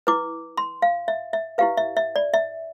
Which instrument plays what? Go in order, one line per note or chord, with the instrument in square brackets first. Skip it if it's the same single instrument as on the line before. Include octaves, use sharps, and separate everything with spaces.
[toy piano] E4 B4 D6
C6
F5
E5
E5
E4 G4 B4 F5
E5
E5
D5
E5